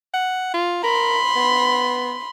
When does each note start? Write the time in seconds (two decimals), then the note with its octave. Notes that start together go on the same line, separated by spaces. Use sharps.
0.14 F#5
0.54 F4
0.84 A#4 B5 C6
1.36 B3